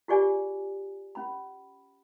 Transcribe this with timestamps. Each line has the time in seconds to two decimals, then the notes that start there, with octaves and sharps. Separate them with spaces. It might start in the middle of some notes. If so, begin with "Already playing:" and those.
0.08 F4 G4 G#4 D5 G#5
1.15 C#4 B5